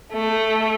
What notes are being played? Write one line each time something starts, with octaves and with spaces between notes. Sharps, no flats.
A3